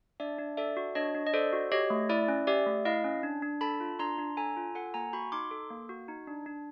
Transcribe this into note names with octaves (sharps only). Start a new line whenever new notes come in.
D4 D5 E5
D4
A4 D5 E5
F#4
D4 C#5 D#5
D4
D#5
A4 C5 D5
F#4
G4 C#5 D#5
A3
E4 D5 E5
C#4
G4 D5 E5
A3
E4 D#5 F5
C#4
D4
D4
A4 A5 B5
F4
D4 A#5 C6
D4
A4 G#5 A#5
F4
A4 F#5 G#5
A#3 G#5 A#5
F#4 B5 C#6
D#4 C6 D6
A4
A#3
F#4
D#4
D4
D4